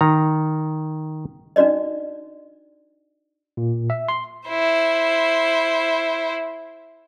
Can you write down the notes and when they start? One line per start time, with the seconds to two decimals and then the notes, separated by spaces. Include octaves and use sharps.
0.01 D#3 A#5
1.56 D4 D#4 F#4 D5 D#5
3.57 A#2
3.90 E5
4.09 C6
4.49 E4 C5